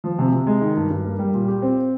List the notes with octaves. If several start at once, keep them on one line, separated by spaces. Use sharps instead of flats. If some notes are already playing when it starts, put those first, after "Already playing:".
F3
C3
C3
G#3
D#3
G2
G2
A#3
G3
A#2
G4
C4